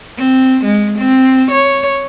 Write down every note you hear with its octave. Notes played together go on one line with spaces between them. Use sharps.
C4
G#3
C4
C#5